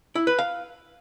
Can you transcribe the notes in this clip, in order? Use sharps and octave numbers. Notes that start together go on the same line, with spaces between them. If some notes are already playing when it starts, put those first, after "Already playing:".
E4
B4
F5